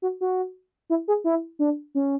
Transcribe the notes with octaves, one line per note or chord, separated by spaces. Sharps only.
F#4
F#4
E4
G#4
E4
D4
C#4